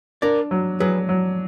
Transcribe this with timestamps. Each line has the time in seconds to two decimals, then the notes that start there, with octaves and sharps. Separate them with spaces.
0.22 D4 A#4 D5
0.51 F#3
0.80 F#3 G#4 B4
1.09 F#3